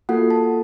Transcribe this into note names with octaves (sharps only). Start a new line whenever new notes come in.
A#3 F4 F#4 A4 F#5
A4 A5